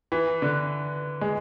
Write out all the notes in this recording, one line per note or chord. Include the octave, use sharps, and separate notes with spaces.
E3
D3
G#3